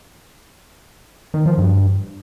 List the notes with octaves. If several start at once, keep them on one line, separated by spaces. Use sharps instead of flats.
D#3
F3
G2